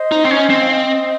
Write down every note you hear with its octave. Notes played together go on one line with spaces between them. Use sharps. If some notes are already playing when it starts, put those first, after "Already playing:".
Already playing: C5 D#5
D#4
C4
C#4
C4
F5
C5 D#5